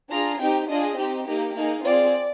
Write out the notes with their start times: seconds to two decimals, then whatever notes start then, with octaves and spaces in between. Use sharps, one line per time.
0.10 D4 F4 G#4 A#5
0.39 C4 D#4 G4 G5
0.68 D4 F4 G#4 D#5
0.97 C4 D#4 G4
1.26 A#3 D#4 G4
1.56 A#3 D#4 G#4
1.84 C4 F4 G#4 D5